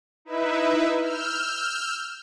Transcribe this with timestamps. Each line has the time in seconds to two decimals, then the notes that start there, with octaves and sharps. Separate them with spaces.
0.25 D#4 E4 B4 E5
0.99 E6 F6 G6